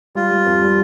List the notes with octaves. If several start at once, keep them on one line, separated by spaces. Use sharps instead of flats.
G3 F4
G3
F2
G3